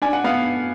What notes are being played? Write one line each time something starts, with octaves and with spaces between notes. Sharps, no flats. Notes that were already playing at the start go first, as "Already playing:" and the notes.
D4 G#5
F#5
B3 F5